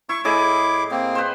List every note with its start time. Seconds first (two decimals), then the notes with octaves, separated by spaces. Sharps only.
0.09 E4 C#6
0.25 A2 E4 G#4 D#5 D6
0.91 A#3 C4
1.15 B4 C5